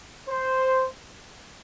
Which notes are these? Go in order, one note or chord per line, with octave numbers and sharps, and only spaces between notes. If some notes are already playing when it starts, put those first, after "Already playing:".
C5